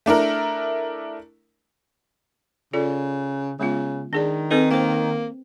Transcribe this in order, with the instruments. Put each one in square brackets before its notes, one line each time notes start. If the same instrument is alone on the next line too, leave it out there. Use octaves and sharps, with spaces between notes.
[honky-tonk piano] A3 D4 E4 A#4
[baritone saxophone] C#3 [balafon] F4 A4 D5
[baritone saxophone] C#3 [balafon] G#3 B3 F4
[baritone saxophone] D#3 [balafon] D4 G#4 D5
[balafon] C4 A4 B4 [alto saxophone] D#4
[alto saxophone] A#3 [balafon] C5 G5